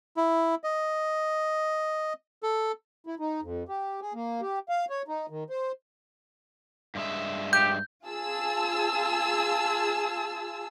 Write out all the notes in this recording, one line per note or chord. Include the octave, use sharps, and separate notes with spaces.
E4
D#5
A4
E4
D#4
F2
G4
G#4
A#3
G4
F5
C#5
D#4
D#3
C5
G2 G#3 E5
G4 G6
F4 G#4 A5 E6